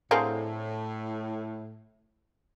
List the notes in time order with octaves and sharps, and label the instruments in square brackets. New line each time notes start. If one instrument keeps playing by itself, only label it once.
[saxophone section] A2 [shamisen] D3 C4 A#4 [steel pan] G#4 C5 F5